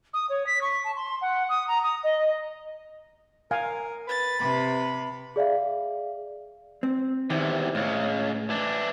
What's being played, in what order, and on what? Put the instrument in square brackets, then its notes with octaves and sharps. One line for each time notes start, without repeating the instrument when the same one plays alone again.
[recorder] D#6
C#5
B6
C#6
A5
C6
F#5
D#6
A#5
D#6
D#5
[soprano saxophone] A#4 [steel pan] F5 G#5
[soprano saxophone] B4 [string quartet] A6
[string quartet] C3 B4 [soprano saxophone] B5
[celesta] G#4 D5 E5 F5
[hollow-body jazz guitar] C4
[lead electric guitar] E2 C3 [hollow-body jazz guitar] D#3 E3
[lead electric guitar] C#2 C#3 [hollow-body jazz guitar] A2
[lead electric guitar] E3 D4